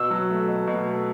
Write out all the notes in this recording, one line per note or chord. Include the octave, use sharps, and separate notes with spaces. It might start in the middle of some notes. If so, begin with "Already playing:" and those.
Already playing: B2 E6
F#3
A3
B2
B2
A3